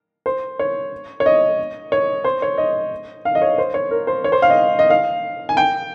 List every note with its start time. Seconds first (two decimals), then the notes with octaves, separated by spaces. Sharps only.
0.26 C5
0.59 C#5
1.20 C#5
1.26 D#5
1.92 C#5
2.24 C5
2.42 C#5
2.58 D#5
3.25 F5
3.35 D#5
3.42 C#5
3.58 C5
3.74 C#5
3.91 A#4
4.07 C5
4.24 C#5
4.32 C5
4.42 F5
4.50 D#5
4.79 D#5
4.90 F5
5.49 G#5
5.57 G5